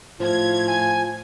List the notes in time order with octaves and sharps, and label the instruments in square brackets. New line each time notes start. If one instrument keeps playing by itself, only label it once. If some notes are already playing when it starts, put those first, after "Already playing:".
[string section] A2 G#6 [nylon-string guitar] F3 [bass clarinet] F4
[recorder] G#5